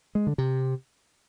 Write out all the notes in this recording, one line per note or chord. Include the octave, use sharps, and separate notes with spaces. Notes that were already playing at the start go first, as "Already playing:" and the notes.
G#3
D3
C3